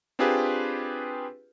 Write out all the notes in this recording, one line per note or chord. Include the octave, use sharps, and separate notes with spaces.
C4 D4 F4 G4 G#4 B4